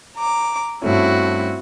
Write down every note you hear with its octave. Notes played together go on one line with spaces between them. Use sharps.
A#5 D6
G2 A3 C4 C#4 E4 F#4